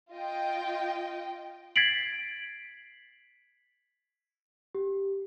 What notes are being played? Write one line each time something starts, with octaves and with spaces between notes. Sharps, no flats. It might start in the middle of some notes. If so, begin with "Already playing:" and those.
F4 D#5 G5
G#6 A6 B6 C7 D7 F#7
G4